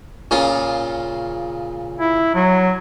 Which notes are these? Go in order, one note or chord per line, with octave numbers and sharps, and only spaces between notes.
A#2 C#3 F4
E4
F#3